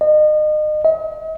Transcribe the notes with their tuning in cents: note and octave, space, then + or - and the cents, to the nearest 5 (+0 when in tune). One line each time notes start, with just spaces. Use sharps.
D#5 -35
D#5 +40